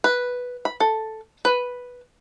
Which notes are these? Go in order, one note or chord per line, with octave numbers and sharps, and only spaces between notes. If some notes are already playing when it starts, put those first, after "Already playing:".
B4
B5
A4
B4